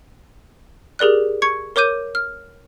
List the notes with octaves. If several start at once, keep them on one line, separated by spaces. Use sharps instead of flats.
G4 G#4 A#4 D5 F#6
C#6 G#6 C#7
A#4 C#5 D6 G6 D#7
F6